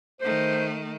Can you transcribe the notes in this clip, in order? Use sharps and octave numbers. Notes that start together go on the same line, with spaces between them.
D#3 A3 C5